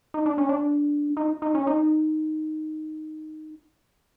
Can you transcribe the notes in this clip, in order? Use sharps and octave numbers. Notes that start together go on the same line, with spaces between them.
D#4
D4
C#4
D4
D#4
D#4
C#4
D#4